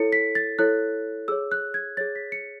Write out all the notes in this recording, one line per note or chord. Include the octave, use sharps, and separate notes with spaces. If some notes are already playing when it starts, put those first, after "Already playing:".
Already playing: E4 A4 C#5 C#7
B6
A6
E4 A4 C#5 F#6
G#4 C#5 E6
F#6
G#6
G#4 C#5 A6
B6
C#7